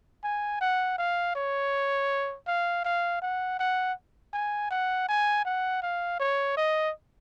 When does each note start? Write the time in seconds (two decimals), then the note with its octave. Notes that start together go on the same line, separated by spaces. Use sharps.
0.24 G#5
0.61 F#5
0.98 F5
1.36 C#5
2.48 F5
2.85 F5
3.22 F#5
3.60 F#5
4.34 G#5
4.71 F#5
5.09 G#5
5.45 F#5
5.83 F5
6.20 C#5
6.57 D#5